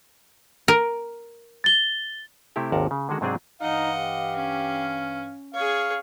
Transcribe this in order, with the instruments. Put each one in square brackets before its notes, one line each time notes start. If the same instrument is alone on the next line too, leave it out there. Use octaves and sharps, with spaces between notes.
[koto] A#4
[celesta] A6 G7
[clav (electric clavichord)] C3 A3 C4 E4 G4
G#1 D#2 C3 A#4 F#5 A5
C#3
D3 D#3 G#3 F#4
G#2 C3 F#3 C4 D4 G#4
[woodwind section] G2 E3 F5 [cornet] D#4 [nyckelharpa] D#5 F#5
[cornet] G4
[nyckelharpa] C#4
[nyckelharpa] G#4 C#5 [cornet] F5